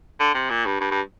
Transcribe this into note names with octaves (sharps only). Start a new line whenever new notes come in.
D3
C3
A#2
G2
G2
G2